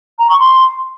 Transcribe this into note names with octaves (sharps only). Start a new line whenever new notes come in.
A#5
C#6
C6